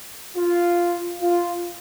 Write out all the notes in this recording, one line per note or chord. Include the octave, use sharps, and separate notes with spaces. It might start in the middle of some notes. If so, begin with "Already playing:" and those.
F4
F4